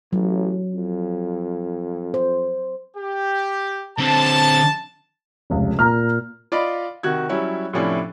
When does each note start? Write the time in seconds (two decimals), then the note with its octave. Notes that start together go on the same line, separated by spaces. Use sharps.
0.13 A1 F#3
0.75 F2
2.14 C5
2.97 G4
3.98 D3 C4 A5
5.50 F1 C#2
5.79 A#2 A#5 F6
6.52 F4 D5 D#5 F5 B5
7.03 C3 D#3 F#4 F#6 G#6
7.29 F#3 G3 C#4 E4 C#5
7.73 A2 C3 F3 C#4 D4 E4